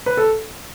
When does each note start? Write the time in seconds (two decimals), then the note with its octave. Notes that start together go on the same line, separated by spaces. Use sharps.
0.06 B4
0.17 A4